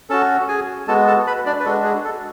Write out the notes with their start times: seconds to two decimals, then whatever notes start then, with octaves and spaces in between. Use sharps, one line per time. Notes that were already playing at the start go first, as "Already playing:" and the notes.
0.10 C#4 F#4 A4 A5
0.48 G#4 G#5
0.88 G#3 B3 F#4 A4 A5
1.07 A4 A5
1.27 B4 B5
1.46 D4 D5
1.60 B4
1.65 G#3 D4 F#4 A4
1.84 G#4
2.04 A4